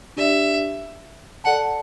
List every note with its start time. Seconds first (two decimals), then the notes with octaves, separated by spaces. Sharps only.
0.17 D4 G4 D5 E5
1.44 A4 D5 F#5 A5